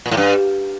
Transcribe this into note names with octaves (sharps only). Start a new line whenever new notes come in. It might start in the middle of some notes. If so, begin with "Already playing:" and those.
A#2
A2
G2